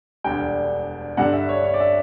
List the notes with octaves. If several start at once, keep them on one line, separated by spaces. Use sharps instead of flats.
E1 D2 D3 G3 G5
G2 D3 G3 F#5
E5
C#5
C#5
D5
E5